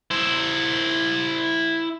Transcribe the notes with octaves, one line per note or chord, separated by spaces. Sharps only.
E4 C5